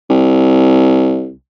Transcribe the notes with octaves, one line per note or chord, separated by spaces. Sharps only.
C2